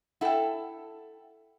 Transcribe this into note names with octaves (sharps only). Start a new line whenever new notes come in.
E4 A4 F#5 G5